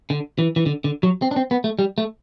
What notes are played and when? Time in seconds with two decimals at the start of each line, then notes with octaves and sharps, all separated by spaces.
0.10 D3
0.39 E3
0.56 E3
0.66 D3
0.84 D3
1.03 F#3
1.22 C4
1.31 D4
1.36 C4
1.51 B3
1.64 A3
1.79 G3
1.98 A3